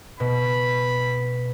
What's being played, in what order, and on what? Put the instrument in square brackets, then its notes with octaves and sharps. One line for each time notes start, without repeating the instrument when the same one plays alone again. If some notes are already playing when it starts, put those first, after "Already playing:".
[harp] B2 [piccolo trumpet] B5